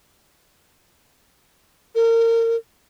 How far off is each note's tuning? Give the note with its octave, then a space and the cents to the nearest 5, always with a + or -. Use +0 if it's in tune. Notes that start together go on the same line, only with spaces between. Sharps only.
A#4 -30